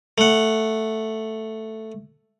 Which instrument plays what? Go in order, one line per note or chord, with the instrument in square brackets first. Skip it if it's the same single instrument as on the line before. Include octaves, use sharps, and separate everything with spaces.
[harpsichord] A3 F#5